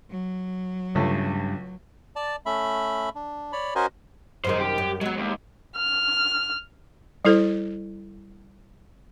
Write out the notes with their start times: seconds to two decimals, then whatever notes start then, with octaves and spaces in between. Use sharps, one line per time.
0.10 F#3
0.95 C#2 G2 C#3 A3
2.16 D5 A5
2.46 A3 C#4 E5 B5
3.15 D4
3.52 C#5 D5 B5
3.75 C#4 F#4 A#4 C5 D#5 G#5
4.45 F#2 C3 D#3 G#4 C5
4.60 G4
4.78 F#2
5.01 F#3 G#3 B3
5.17 D#2
5.76 F6
7.25 G3 E4 A4 C5